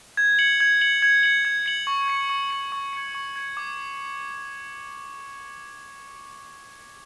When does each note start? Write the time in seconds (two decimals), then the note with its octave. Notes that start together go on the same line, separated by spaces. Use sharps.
0.17 G#6
0.39 C#7 F#7
0.60 G#6
0.81 C#7 F#7
1.02 G#6
1.23 C#7 F#7
1.45 G#6
1.66 C#7 F#7
1.87 C#6
2.08 G#6 C#7
2.30 C#6
2.50 G#6 C#7
2.72 C#6
2.93 G#6 C#7
3.15 C#6
3.36 G#6 C#7
3.57 D6